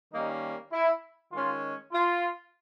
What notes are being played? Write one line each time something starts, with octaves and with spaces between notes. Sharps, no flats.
D#3 G3 A#3 C#4 D#4
E4
D#3 G#3 C#4 F4
F4